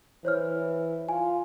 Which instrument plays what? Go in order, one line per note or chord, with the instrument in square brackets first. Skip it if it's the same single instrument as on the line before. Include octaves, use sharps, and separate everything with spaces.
[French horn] E3 [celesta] C5 C#5 F6
[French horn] F4 [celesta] G#5